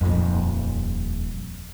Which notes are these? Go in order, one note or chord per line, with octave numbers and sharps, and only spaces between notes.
D#1 F2